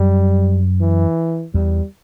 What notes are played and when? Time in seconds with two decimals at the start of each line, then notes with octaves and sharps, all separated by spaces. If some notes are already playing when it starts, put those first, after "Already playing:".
Already playing: F#2 G3
0.81 E3
1.54 E2 G3